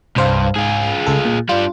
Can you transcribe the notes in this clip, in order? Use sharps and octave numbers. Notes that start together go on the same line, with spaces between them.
C2 G2 C5 F5
G#2 F4 G#4
C#2 A4
A#2
G3 D4 F4